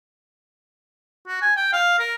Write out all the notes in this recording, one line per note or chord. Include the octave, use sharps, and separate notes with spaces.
F#4
G#5
G5
F5
A#4